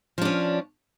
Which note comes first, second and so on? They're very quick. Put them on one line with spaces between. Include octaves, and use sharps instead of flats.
F3 D4 C#4